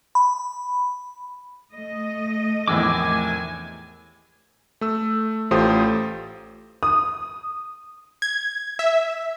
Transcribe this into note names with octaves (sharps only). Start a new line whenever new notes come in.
B5
A3 D#5
A#1 E2 A2 C3 D#3 G#5 D6 E6
A3 E6
A1 A3 F4 G4 C5 D#6
D#6
G#6
E5